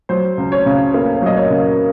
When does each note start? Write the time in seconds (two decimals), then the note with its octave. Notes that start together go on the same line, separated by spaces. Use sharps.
0.09 F#3 C5
0.37 C#2
0.52 C#5
0.66 C#3
0.94 A#3
1.22 F#3 D#5
1.37 C#5
1.50 C#3